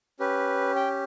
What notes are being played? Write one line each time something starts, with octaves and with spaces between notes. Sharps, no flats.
C#4 G4 B4
G5